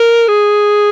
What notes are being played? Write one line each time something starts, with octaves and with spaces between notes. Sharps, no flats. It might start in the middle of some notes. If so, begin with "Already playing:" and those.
Already playing: A#4
G#4